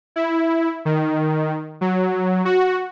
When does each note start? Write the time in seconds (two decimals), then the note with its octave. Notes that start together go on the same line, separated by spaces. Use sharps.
0.16 E4
0.85 D#3
1.81 F#3
2.45 F#4